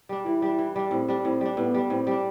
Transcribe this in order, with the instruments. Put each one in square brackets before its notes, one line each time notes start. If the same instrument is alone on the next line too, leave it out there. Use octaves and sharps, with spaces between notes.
[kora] G3 D4
[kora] E3 [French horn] E4
[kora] G3 D4
E3
G3 D4
[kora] A2 [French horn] C4
[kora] G3 D4
[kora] A2 [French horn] C4
[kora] G3 D4
[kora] A2 [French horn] B3
[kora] G3 D4
[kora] A2 [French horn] C4
[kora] G3 D4